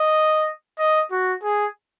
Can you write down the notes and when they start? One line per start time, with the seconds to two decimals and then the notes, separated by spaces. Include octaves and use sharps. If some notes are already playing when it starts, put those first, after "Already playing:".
Already playing: D#5
0.79 D#5
1.11 F#4
1.43 G#4